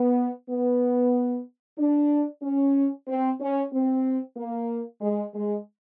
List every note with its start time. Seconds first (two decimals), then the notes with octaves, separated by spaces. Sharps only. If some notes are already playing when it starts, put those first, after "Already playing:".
Already playing: B3
0.49 B3
1.78 D4
2.43 C#4
3.08 C4
3.40 C#4
3.72 C4
4.37 A#3
5.01 G#3
5.34 G#3